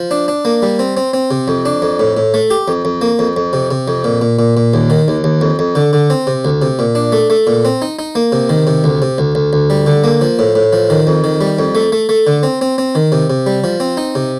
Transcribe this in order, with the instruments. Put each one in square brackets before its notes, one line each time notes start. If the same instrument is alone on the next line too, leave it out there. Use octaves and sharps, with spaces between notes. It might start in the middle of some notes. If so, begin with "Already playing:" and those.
Already playing: [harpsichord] F3
D4
D4
A#3
G3
C4
C4
C4
C3
F2
D4
F2
A2
A2
A3
G4
F2
F2
A#3
F2
F2
C3
C3
F2
A#2
A#2
A#2
A#2
D#2
D#3
D#2
D#2
F2
F2
D3
D3
C4
C3
D2
C3
A#2
D4
A3
A3
A#2
C4
D#4
D#4
A#3
C3
D#3
C3
D2
C3
D2
D2
D2
G3
D3
A#3
F3
A2
A2
F3
D#3
F2
D#3
G3
F2
A3
A3
A3
D3
C4
C4
C4
D#3
C3
C3
G3
F3
C4
D#4
C3